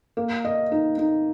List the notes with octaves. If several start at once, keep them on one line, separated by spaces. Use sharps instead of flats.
A#3
D#5
D#4
D#4